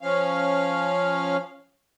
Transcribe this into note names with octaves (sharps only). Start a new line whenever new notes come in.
F3 C#4 F5